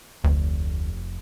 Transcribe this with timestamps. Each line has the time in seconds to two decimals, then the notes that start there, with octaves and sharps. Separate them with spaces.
0.24 F1 D2